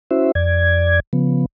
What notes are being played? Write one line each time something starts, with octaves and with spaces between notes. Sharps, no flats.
C#4 E4 F#4 C5 E5
F2 D5 G#6
C#3 F3 B3